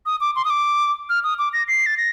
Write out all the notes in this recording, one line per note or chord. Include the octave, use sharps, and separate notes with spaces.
D#6
D6
C6
D#6
D6
F6
D#6
D6
A#6
C7
A6
A#6